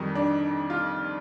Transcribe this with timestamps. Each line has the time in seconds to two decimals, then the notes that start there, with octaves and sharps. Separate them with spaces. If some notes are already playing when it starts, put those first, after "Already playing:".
Already playing: F2 D#3 G3 D#4
0.15 D4
0.70 F4